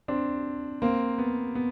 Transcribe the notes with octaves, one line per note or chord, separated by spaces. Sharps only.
C4 D4
A#3 C4
B3
B3